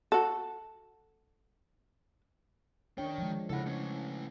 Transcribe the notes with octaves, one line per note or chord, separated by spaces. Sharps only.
F#4 A4
D#3 D4 C#5 G5
F3 G#3
C#3 E4 A4 F#5 B5
A3 C#4